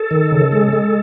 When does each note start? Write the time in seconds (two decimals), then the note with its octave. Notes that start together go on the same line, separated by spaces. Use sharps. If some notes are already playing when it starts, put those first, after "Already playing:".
Already playing: A4
0.11 D#3
0.32 C#3
0.52 G#3
0.73 G#3